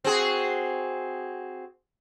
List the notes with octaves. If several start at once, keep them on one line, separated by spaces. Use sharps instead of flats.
C4 F#4 G#4